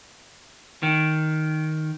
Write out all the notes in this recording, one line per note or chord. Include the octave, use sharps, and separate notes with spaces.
D#3